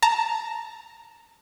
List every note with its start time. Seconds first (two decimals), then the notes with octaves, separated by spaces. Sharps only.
0.02 A5 A#5